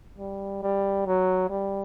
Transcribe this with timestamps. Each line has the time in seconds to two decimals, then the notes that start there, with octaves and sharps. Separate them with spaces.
0.18 G3
0.63 G3
1.06 F#3
1.50 G3